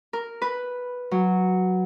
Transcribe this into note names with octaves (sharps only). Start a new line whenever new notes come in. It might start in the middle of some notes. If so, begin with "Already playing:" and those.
A#4
B4
F#3